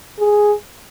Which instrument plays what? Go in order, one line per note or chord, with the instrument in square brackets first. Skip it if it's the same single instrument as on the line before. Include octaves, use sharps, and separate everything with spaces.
[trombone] G#4